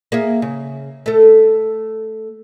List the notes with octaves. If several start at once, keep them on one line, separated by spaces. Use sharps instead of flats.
A#3 G#4 E5
C#3
A3 A4